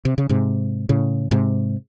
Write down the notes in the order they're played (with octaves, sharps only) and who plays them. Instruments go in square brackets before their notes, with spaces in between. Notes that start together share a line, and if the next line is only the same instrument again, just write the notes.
[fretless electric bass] C3
C#3
G#2 C3
A2 C#3
G#2 C3